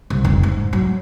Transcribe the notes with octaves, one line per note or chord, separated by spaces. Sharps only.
C2
F1
G#2
F#3